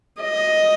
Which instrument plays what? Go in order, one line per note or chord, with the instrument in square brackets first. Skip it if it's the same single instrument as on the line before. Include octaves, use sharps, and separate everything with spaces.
[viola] D#5